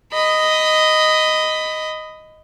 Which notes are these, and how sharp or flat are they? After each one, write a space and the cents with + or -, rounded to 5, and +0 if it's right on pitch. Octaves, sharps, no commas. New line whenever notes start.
D#5 +0 B5 +15